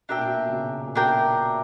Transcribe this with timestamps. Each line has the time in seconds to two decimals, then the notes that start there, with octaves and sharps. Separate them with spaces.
0.09 B2 D4 A#4 E5 G5
0.17 A#2
0.25 B2
0.49 C#3
0.52 B2
0.86 A#2
0.95 B2 D4 A#4 E5 G5